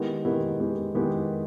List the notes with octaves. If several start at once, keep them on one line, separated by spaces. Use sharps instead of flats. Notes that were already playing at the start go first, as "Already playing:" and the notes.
Already playing: D#3 G#3 B3 E4 G4
D#3 G#3 B3 E4 G4
D#3 G#3 B3 E4 G4
D#3 G#3 B3 E4 G4